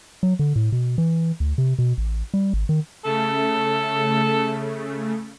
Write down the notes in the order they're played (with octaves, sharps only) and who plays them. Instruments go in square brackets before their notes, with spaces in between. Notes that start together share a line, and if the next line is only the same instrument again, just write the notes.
[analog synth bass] F#3
D3
A2
B2
E3
D2
C3
B2
A1
G3
G#1
D#3
[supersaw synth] C#3 A3 [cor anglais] A4